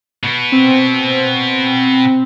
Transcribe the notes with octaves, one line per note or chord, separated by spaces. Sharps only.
B2 B3
C4